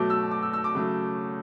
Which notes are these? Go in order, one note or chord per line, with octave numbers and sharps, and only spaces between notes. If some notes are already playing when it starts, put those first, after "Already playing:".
Already playing: B2 F#3 A3 D6
E6
D6
E6
E6
D6
C#3 F#3 A3